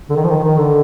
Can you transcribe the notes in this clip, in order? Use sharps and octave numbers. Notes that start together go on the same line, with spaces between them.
D3
D#3
F3
D#3
D#3
D3